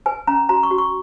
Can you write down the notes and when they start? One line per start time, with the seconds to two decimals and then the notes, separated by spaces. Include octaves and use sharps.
0.06 B4 G#5
0.27 C#4 A#5
0.49 F#4 A#5
0.63 C#6
0.71 F#4
0.78 C#6